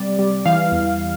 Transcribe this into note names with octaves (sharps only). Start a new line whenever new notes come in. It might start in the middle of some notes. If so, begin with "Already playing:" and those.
Already playing: C3 G3 D5
G3
E3 F5
E2